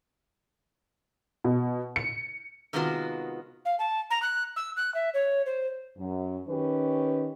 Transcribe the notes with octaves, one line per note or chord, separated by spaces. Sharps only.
B2
C#7
C3 D#3 G#3 B3 F4 F#4
F5
A5
A#5
F#6
E6
F#6
E5
C#5
C5
F#2
D#3 C#4 G4 B4